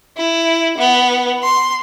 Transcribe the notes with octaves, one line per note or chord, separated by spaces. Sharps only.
E4
B3
C6